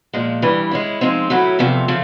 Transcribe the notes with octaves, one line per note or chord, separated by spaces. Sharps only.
A#2 F3 G#3
G2 E3 G3
G#3 C#4 E4
F3 G#3 C4 D#4
A2 F#3 A3 C#4 E4
E2 C3 F3 A3
C#3 F3 A3